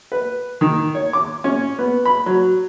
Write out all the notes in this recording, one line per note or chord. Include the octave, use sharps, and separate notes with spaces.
B4
D#3
C#5
D6
C#4
B3
B5
F#3